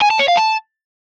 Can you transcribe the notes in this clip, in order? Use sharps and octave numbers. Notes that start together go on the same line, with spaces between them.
G#5
A5
C#5
F5
A5